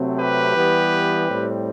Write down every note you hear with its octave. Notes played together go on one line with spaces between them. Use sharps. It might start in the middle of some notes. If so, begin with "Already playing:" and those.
Already playing: C3 F#3 A3 C4
G4 B4
E3 G3 B3
A2 G3 C4